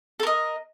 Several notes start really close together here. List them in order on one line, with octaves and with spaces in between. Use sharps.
A4 A#4 D#5